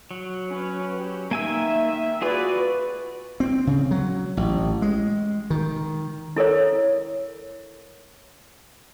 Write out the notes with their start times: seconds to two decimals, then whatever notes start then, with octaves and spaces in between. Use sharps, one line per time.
0.11 F#3
0.50 C#4 B4
0.94 G4
1.31 D#3 A#3 E5 G#5 E6
2.22 F4 F#4 G#4 B4 D5 G#5
3.40 C4
3.67 C#3
3.91 F#3
4.37 A1
4.82 G#3
5.50 D#3
6.37 E4 A4 A#4 C#5